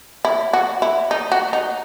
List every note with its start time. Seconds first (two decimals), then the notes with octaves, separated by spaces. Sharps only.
0.25 E4
0.53 F#4
0.82 E4
1.11 D#4
1.32 F#4
1.53 D#4